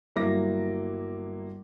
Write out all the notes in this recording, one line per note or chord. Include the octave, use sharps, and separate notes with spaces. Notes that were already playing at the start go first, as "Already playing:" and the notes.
G1 F#3 A#3 E4 D6 A#6